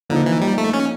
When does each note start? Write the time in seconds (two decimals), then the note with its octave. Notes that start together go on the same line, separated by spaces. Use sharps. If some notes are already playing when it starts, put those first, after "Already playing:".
0.09 D3 F3 A#3 D#4
0.26 E3
0.41 G3
0.58 A3
0.73 C#4